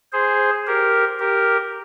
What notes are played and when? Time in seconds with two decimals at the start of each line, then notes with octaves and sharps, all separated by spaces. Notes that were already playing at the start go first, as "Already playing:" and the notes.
0.13 G#4 C5
0.67 G4 A#4
1.20 G4 A#4